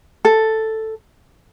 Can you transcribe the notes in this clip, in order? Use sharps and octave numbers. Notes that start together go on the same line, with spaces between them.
A4